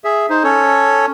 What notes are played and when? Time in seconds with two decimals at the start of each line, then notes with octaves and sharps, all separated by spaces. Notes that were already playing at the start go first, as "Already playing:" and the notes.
0.04 G#4 E5
0.30 D#4 C5
0.44 C#4 A4 C#5